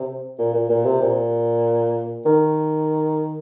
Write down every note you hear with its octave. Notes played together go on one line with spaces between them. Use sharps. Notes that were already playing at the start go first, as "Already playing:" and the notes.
Already playing: C3
A#2
A#2
A#2
C3
A#2
D#3